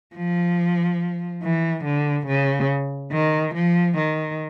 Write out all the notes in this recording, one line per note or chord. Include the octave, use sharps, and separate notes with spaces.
F3
E3
D3
C#3
D#3
F3
D#3